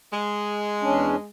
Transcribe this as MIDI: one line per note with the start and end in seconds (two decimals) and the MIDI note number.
0.12 1.29 56
0.81 1.16 40
0.81 1.16 61
0.81 1.16 62